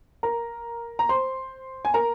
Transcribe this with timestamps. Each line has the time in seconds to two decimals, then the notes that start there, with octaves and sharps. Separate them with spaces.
0.23 A#4 A#5
0.99 A#5
1.09 C5 C6
1.85 G#5
1.94 A#4 A#5